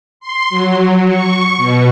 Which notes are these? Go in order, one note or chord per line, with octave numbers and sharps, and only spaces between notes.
C6
F#3
C#6
B2